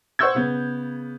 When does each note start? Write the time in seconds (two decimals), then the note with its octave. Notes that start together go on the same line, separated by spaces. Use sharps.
0.19 C5 F#5 C#6 E6 G6 G#6
0.35 C#3 B3